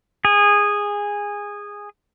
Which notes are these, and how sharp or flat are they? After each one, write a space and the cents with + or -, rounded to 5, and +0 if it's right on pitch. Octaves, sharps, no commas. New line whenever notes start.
G#4 -15